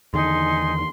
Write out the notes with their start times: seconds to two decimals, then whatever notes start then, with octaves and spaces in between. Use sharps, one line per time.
0.14 E2 D3 D#3 D#4 G#5 C6